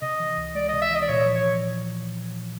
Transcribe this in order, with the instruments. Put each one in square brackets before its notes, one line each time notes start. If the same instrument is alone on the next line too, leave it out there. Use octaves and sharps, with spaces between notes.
[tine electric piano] C3 [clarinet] D#5
[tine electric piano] E3
C#2
[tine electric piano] G#3 [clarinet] D5
[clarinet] D#5
[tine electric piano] C3
[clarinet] E5
[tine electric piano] E3 [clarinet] D#5
[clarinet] D5
[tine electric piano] A#2 [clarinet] C#5
[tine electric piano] F3
[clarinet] C#5